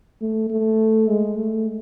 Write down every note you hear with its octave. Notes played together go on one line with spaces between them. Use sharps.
A3
A3
G#3
A3